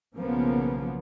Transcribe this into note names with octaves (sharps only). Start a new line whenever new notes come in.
B1 C#3 F3 A#3 B3